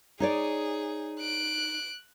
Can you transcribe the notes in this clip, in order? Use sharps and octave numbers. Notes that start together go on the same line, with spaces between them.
D#4 G#4 C#5 D5
F#6 D7